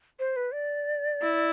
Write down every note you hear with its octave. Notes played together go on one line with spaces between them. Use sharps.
C5
B4
D5
E4